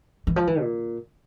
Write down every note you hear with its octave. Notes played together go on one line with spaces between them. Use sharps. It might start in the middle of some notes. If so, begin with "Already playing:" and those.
E3
F3
E3
A#2